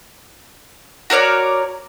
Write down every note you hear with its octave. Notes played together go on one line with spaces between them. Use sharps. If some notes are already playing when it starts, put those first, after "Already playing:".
F#4 A#4 C#5 D5